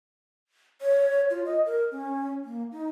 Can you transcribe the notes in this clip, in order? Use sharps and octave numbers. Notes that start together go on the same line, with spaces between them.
C#5
F4
D#5
A#4
C#4
A#3
D#4